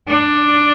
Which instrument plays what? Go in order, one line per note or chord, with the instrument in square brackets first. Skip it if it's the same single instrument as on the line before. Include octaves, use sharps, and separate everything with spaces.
[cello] D4